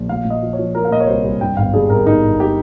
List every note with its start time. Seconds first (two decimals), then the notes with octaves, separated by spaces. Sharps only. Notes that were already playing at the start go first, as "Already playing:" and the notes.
Already playing: A#1
0.09 A#2 F5
0.25 A#2
0.30 D#5
0.43 F3
0.53 C#5
0.59 F3
0.75 F3 A#4
0.85 F5
0.91 A#2 D#5
1.00 C#5
1.07 C2 C5
1.24 C2
1.41 G2 G5
1.57 G1 F5
1.73 G2 G#4
1.90 G1 A#4
2.06 G1 D#4
2.23 G1
2.40 G4